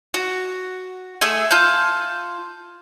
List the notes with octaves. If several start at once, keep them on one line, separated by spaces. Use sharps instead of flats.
F#4
A3 G#4 E5 G#5
F4 A5 G6